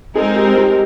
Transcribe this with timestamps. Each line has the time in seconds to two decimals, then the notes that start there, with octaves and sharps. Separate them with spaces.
0.15 G#3 C4 D#4 G#4 A#4
0.36 G4
0.57 G4